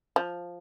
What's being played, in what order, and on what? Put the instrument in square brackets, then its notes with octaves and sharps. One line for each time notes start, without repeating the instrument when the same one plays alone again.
[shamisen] F3